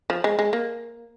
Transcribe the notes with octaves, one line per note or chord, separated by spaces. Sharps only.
F3
G#3
G#3
A#3